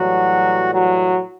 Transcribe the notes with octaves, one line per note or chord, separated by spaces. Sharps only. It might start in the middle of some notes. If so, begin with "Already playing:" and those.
Already playing: A2 E3 F#3 G3 F#4
F#3 F#4